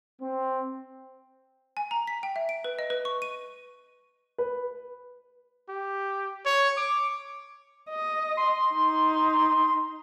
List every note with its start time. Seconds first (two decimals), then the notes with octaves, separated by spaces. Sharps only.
0.21 C4
1.77 G#5
1.91 A#5
2.07 B6
2.23 G5
2.36 E5
2.49 D7
2.64 B4
2.79 D#5
2.90 B4
3.05 C#6
3.22 D#7
4.38 B4
5.69 G4
6.46 C#5
6.77 D6
7.90 D#5
8.37 C6
8.75 D#4